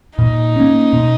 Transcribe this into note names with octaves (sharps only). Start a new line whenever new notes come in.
A#2 D#4
A#3 C#4
B2